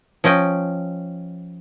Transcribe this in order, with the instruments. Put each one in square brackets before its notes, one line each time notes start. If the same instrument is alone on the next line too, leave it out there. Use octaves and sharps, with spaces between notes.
[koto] F3 C#4 D#5 G5